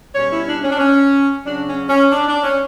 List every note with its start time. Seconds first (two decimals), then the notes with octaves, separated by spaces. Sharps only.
0.14 B2 G3 C#4 C#5
0.30 E4
0.46 D4
0.63 C#4
0.70 D4
0.78 C#4
1.45 C#3 F#3 C#4 D4
1.67 C#4
1.89 C#4
2.11 D4
2.28 D4
2.43 C#4